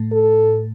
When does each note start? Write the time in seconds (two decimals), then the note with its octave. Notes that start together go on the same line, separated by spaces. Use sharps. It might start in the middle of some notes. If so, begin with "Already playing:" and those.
Already playing: A2 A3
0.12 A4